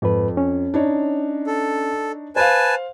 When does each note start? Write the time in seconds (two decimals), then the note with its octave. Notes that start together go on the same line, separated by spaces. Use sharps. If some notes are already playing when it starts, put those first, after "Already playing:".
0.02 F2 G#2 B4
0.37 C#4
0.74 D4 D#4 C#5
1.47 A4
2.36 B4 C5 F5 G#5 A5